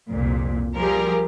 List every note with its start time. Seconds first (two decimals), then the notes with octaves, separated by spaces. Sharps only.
0.10 C2 F2 A#2
0.75 F3 G3 G4 G#4 A#4